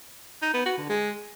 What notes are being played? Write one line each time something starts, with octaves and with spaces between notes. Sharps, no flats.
D#4
B3
F#4
D3
G#3